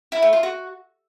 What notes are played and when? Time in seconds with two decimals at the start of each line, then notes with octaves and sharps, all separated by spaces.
0.12 E4
0.22 A3
0.33 F4
0.43 F#4